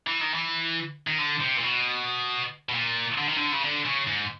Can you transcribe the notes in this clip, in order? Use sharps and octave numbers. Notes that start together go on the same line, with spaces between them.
E3
D#3
E3
D#3
D3
C3
A#2
B2
B2
A#2
D3
D#3
D3
C#3
D3
C#3
G#2